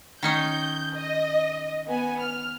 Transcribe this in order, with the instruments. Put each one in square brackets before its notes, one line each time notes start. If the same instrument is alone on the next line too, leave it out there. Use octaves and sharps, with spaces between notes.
[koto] D#3 C#4 D#4 [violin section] G6
[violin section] D#5
B3 G#5
F6